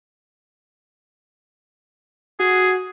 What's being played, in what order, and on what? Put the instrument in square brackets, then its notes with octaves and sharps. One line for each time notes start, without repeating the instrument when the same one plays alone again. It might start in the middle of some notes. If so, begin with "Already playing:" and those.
[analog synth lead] F#4 [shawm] G#4